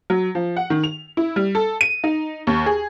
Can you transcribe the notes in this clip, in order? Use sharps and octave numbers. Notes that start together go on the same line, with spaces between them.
F#3
F3
F#5
D#3
F7
E4
G3
A4
D#7
D#4
D#2
G#4